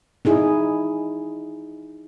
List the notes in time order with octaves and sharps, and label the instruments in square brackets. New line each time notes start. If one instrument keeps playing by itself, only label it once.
[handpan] D#4 E4 G#4